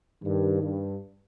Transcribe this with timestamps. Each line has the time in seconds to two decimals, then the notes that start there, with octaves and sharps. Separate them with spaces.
0.24 G2 D#3
0.62 G2